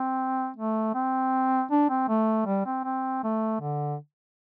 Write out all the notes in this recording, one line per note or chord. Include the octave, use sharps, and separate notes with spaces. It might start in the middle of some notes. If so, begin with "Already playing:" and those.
Already playing: C4
A3
C4
D4
C4
A3
G3
C4
C4
A3
D3